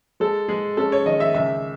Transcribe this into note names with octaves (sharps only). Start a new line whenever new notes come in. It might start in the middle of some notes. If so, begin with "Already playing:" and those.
G#3 A4
G#3 G#4
C#4 A4
C#5
D#3 D#5
E5
C#2 E5